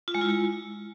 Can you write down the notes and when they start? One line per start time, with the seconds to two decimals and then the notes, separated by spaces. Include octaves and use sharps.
0.08 F4
0.15 G#3
0.21 E4